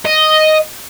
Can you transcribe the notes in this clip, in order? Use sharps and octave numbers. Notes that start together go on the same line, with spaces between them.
D#5